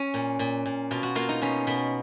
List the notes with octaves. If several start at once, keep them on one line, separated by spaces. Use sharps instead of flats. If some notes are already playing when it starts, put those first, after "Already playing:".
Already playing: C#4
A#2
A#2
A#2
B2 F4
F#4
A#3 F4
D#4
B2 C#4
B2 B3